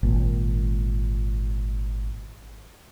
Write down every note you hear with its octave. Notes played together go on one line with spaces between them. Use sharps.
G#1 A#2